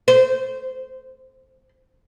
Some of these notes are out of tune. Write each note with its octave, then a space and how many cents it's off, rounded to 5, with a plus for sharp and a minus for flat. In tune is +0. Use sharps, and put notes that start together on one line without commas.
C5 -20